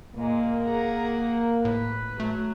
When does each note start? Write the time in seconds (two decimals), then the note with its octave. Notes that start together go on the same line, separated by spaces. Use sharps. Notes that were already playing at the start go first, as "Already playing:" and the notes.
0.16 A#2 G#3 A#3
0.65 G#4 F#5 A#5
1.65 A2 B4
2.20 F#3 A3